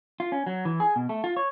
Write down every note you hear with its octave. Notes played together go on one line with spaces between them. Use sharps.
F4
C#4
F#3
E3
G#4
B2
A3
F4
C#5